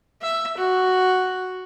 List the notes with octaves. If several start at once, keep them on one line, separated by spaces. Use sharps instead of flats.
E5
F#4